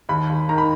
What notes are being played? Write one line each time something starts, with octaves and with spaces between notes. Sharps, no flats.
D#2 B5
D#2
D#3 A#5
B5